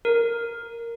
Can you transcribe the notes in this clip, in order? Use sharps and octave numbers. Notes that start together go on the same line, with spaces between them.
A#4